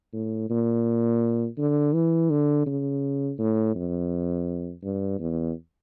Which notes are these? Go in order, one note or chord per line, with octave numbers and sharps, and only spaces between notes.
A2
A#2
D3
E3
D3
C#3
A2
F2
G2
E2